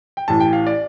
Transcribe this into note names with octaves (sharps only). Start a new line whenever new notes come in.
G5
A1 A2 E3 A5
G5
F5
D5